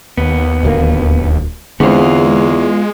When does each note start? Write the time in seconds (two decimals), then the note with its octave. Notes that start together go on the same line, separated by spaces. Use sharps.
0.17 D#2 B3
0.63 D1 D2 A#3
1.80 E2 D3 G#3 B3 C4 F4